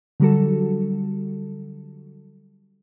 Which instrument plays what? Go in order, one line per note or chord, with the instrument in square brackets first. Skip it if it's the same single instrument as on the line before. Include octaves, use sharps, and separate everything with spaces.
[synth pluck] D3 F#3 G3 F#4 A4